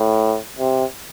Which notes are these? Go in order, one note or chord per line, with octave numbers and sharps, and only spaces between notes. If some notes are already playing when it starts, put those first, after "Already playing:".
Already playing: A2
C3